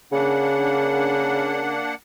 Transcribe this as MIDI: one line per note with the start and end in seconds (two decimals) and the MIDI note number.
0.12 1.82 49
0.12 1.95 58
0.12 1.95 62
0.12 1.95 78